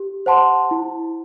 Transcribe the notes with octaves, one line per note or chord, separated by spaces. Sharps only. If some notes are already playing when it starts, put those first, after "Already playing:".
Already playing: G4
C5 F#5 A5 C6
E4